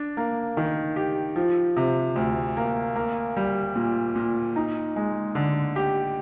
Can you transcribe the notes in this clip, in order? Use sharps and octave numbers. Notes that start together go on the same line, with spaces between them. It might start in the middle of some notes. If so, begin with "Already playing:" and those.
Already playing: D4
A#3
D#3
G4
F3
C3
D2
A#3
A#3
G3
A#2
A#2
D#4
G#3
D3
G4